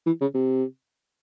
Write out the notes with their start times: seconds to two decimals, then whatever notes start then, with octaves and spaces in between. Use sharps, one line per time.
0.06 E3
0.21 C#3
0.34 C3